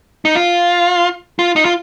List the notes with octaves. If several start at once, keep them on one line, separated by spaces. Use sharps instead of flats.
D#4
F4
F4
D#4
F4